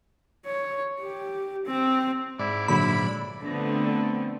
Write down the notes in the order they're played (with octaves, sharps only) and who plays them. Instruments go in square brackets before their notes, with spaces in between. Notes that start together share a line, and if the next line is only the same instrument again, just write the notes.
[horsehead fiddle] C#5
G4
C4
[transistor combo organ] G#2 D5 [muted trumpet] E4
[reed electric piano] A#2 D3 F#3 [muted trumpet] E4 [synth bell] B5
[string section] D3 F3 A3 B3 C4